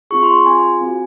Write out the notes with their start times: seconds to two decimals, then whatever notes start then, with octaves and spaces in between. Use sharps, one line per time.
0.11 C4 F4 G#4 C#6
0.23 C6
0.34 C6
0.45 C4 F4 G#4 G#5
0.81 C4 F#4